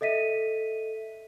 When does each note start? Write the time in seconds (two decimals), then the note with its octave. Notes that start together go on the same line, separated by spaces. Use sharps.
0.01 A4 D#5 E5 B6 D#7